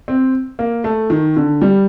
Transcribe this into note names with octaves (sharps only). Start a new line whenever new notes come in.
C4
A#3
A3
D#3
D3
G3